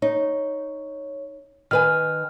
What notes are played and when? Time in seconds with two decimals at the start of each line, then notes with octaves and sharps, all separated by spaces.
0.02 D#4 C#5
1.71 D#3 B4 G#5 F6